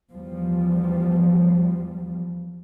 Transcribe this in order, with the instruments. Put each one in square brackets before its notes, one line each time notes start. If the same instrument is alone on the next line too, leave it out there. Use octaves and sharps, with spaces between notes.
[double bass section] E2 F3 G3